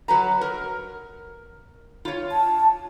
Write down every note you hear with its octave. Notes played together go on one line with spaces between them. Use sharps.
F#3 B4 A#5
A#4
F4 C#5
A5